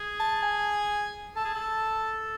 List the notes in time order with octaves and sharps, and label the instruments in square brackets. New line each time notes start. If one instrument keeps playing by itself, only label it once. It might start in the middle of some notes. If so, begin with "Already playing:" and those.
Already playing: [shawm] G#4
[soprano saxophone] A5
G#5
[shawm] A4 [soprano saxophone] A5
[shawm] G#4
A4